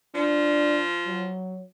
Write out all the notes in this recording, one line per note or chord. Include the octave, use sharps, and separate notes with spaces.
F3 D4
F#3